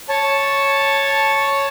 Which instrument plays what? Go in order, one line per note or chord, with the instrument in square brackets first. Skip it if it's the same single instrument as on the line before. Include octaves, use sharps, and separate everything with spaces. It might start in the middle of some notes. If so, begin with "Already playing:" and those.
[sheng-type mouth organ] C#5 A5